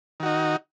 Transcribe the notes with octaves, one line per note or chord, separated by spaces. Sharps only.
D#3 D#4 F#4